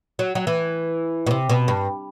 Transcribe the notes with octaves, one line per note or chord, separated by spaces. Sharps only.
F#3
F#3
E3
B2
C3
B2
G2